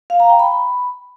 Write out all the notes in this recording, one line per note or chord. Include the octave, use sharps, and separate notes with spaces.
F5
A#5
G5
B5